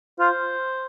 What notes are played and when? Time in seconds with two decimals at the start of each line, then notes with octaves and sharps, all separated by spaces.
0.19 F4 C5